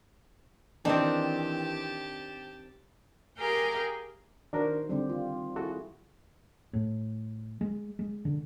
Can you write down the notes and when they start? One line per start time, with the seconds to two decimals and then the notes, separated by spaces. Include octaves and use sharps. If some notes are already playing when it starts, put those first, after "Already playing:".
0.85 D#3 E3 C4 D4 G4 A5
3.38 G4 G#4 A#4 F5 G5 G#5
4.53 D#3 D4 F#4 A#4 C5
4.89 D3 G3 C4 G4
5.09 F4
5.56 E4 F#4 G#4 A4
6.73 A2
7.61 G#3
7.99 G#3
8.25 D3